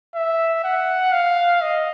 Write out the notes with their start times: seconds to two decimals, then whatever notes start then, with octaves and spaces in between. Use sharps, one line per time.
0.15 E5
0.64 F#5
1.13 F5
1.61 D#5